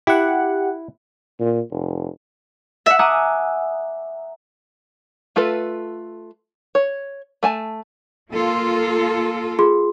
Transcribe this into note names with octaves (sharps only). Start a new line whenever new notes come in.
E4 G4 F#5
A#2
F1
E5 F#5
E5 F#5 G#5 A#5 D6 D#6
A3 F4 A4 B4
C#5
A3 G#5 A5
A#3 F4 A4
F4 G#4 C6